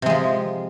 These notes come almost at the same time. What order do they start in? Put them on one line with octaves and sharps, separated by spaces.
C3 G#3 F3